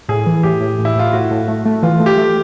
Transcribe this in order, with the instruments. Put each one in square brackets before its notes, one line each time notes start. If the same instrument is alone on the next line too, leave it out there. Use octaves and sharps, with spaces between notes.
[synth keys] A2 [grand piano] G#4
[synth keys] E3
[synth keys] A2 [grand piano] G4
[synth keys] A2
A2
[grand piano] E4
[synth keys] A2 [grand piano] F4
[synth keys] A2 [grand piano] F#4
[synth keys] A2
A3
A3
[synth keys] E3 [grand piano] F4
[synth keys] A3
[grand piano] G4
[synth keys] A3